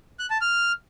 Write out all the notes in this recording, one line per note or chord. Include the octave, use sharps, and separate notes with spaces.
F#6
A5
F6